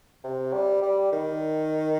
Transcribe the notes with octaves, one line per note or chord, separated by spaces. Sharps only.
C3
G3
G3
D#3